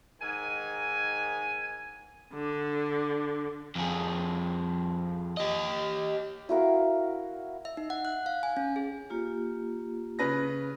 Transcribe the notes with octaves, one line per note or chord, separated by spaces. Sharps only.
G#2 D#3 G#5
D3
F2 G#4
G4 D#5
E4 F#4 A#4 F5
E5
D#4
F#5
F#6
F5
G#5
C#4
G#4
A#3 F4 G4
C#3 B4 A#6